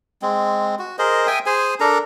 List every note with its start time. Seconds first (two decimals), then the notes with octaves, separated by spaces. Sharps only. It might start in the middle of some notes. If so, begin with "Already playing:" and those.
0.22 G#3 C4
0.79 F#4
0.98 G#4 A#4 C5 D#5
1.27 E5 G5 G#5 D#6
1.46 G#4 C5 G#5
1.80 D4 A4 A#4 A#5